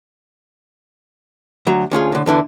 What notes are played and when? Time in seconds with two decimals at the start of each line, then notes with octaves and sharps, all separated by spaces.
1.67 D2 F#3 A#5
1.91 D2 C#4 F4 G#4
2.12 A2 D3
2.26 E2 D3 E3 D4